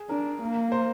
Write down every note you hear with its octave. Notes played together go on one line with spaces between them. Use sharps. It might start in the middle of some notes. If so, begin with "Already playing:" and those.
Already playing: G#4
D4 A#4
A#3
C5